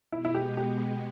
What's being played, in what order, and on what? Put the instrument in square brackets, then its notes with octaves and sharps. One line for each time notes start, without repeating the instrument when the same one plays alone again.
[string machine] B2 G#3 B3 [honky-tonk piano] E4
[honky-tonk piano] E4
G4
G4